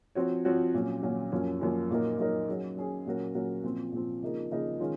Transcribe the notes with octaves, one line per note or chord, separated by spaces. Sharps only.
F3 C4 F#4 C#5
F3 C4 F#4 C#5
A#2 F#3 C#4
A#2 F#3 C#4
F#2 F3 A#3 C#4
F#2 F3 A#3 C#4
A#2 F#3 A#3 D#4 A#4
A#2 F#3 A#3 D#4 A#4
F#3 C#4 G#4
F#3 C#4 G#4
A#2 F#3 C#4 F#4 A#4
A#2 F#3 C#4 F#4 A#4
A#2 F3 C4
A#2 F3 C4
C#3 F3 A#3 D#4 A#4
C#3 F3 A#3 D#4 A#4
D#3 G#3 C#4 F4